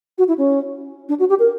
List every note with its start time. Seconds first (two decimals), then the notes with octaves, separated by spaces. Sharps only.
0.18 F#4
0.28 E4
0.38 C#4
1.09 D4
1.20 F#4
1.29 G4
1.39 A#4